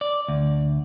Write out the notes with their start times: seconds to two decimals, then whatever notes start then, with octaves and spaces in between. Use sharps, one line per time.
0.01 D5
0.28 D2